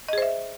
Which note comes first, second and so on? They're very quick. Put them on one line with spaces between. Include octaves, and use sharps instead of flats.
D#5 G#4 C5 E5